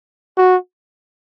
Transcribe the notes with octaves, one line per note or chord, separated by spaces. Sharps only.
F#4